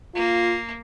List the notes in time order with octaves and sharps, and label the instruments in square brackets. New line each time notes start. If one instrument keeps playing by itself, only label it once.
[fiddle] A#3 [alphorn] F4